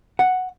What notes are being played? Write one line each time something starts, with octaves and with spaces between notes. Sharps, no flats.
F#5